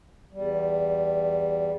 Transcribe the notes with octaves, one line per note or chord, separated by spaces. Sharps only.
E2 G3